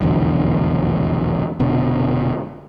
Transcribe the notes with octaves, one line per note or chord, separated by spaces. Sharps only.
F1 B1 E2 D3
F1 B2 D3